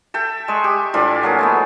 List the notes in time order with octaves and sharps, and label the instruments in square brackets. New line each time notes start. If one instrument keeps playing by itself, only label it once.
[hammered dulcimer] A4 E5 G5
G#3 C#6
G4
A2 E3 D4 F4
F#3 A#3 G#4
G#3 A3 B3